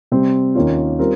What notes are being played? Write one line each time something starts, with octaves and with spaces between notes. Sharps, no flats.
C3 G3 C4
D#2 D#3 A#3 C#4 F4
G3 C4 F4 A#4